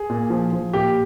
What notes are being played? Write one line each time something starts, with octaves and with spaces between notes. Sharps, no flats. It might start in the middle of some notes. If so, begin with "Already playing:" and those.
Already playing: G#4
A#2
F3
F3
A#2 G4